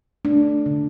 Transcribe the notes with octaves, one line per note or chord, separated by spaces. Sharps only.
A3 D4
D3